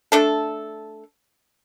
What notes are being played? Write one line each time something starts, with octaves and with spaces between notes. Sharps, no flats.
A3 D4 A4